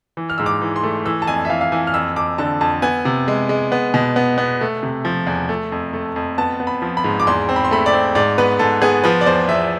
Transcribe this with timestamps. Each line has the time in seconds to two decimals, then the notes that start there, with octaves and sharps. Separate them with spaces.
0.17 E3
0.30 F6
0.38 G#2 E6
0.46 D6
0.62 E3
0.76 C6
0.83 A3
1.06 E3 E6
1.22 A5
1.27 F2 G#5
1.45 E5
1.50 E3 F5
1.61 F5
1.72 E3 G#5
1.87 F6
1.94 F2 E6
2.16 F2 D6
2.38 D3 A5
2.61 F2 A5
2.82 B3 G#5
3.05 C3
3.28 G#3
3.49 G#3
3.72 B3
3.94 B2
4.16 B3
4.38 B3
4.61 A3
4.83 C3
5.05 F3
5.27 E2
5.49 A3
5.72 F2
5.93 A3
6.16 F2
6.38 B3 A5
6.60 B3
6.67 B5
6.82 F3
6.97 B5
7.04 G#2
7.20 D6
7.27 E2 C6
7.49 C4
7.56 B5
7.64 C6
7.71 A3 B5
7.86 D5
7.93 C4
8.15 G#2 D5
8.38 B3 B4
8.59 G#2 A4
8.82 B3 G#4
9.04 F3 B4
9.21 D5
9.26 E2 C5
9.49 E2 E5